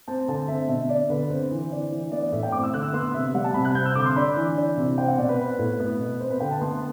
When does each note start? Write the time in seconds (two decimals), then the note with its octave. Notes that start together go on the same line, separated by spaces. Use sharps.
0.08 C4 A5
0.28 D3 A5
0.48 C4 E5
0.68 B2 E5
0.89 D4 D5
1.09 D3 B4
1.30 C4 C5
1.51 E3
1.71 D4
1.91 E3
2.11 B3 D5
2.22 D5
2.32 A2 E5
2.43 G5
2.52 C4 D6
2.63 E6
2.73 D3 F#6
2.83 E6
2.93 B3 C6
3.14 C3 E5
3.28 E5
3.34 G3 F#5
3.44 A5
3.54 C3 B5
3.65 F#6
3.75 C4 G6
3.85 E6
3.95 D3 D6
4.06 C6
4.16 D4 B5
4.36 E3
4.57 D4
4.77 C3
4.98 C4 G5
5.08 F#5
5.18 B2 D5
5.29 B4
5.39 C4
5.59 A2
5.80 B3
5.99 B2
6.20 C4 C5
6.30 B4
6.40 D3 G5
6.51 A5
6.61 B3 C6